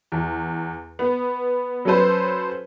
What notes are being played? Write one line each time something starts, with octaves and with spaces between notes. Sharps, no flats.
E2
B3
F#3 C#4 A4 B4 C5